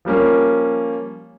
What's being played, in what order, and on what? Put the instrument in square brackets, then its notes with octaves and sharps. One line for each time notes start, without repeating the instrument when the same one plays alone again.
[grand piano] F3 G3 A#3 C#4